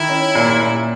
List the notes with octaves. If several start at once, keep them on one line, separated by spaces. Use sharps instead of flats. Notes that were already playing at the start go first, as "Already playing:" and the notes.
Already playing: D#3 E4
C#4
A#2
A#2